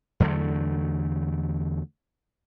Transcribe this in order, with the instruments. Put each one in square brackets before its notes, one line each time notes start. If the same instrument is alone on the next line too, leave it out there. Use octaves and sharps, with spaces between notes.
[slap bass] E2 D3 F#3 A3